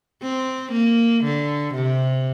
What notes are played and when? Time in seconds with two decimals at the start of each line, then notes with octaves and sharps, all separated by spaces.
0.22 C4
0.72 A#3
1.24 D3
1.74 C3